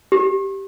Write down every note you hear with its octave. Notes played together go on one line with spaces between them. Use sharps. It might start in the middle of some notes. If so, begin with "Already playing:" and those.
G4